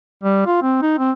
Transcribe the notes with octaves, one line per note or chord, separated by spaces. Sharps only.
G3
F4
C4
D#4
C4